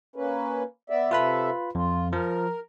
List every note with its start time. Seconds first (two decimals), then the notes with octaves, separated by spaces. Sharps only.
0.16 A#3 C#4 B4
0.90 B3 D5 E5
1.11 C3 F4 A4 B4 E5 B5
1.75 F2 F4
2.13 F3 A#4